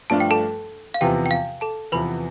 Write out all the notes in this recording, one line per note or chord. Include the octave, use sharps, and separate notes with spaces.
G2 F3 A3 D4 F4 A5
G5
A4 A5
F5
E2 C3 F3 B3 G4 G5
G5
F5
A4 A5
E2 C3 F3 B3 B4 B5